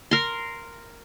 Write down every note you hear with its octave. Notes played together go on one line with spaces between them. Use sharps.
A#4 C6